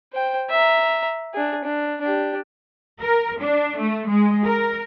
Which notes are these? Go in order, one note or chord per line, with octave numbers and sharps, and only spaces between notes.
C5 G5
E5 A#5
D4 G#4
D4
D4 G4
A#4
D4
A3
G#3
A#4